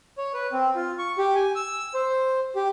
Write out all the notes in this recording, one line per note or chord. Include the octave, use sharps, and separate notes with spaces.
C#5
B4
C4
F4
C#6
G4
G#5
E6
C5
G4